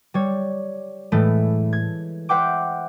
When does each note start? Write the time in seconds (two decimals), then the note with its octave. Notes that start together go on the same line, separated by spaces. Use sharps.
0.14 G3 C#5
1.12 A2 E3 G#3 A3
1.73 G#6
2.29 C5 E5 F#5 G5 D6